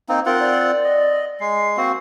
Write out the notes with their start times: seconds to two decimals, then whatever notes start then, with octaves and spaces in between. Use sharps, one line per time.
0.09 A#3 C4 D#4
0.26 C4 F4 A#4 F#5
0.41 D5
0.84 D#5
1.40 G#3 C7
1.77 A#3 C4 F#4